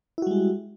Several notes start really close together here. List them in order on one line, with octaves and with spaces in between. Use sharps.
E4 F#4 G3 G#3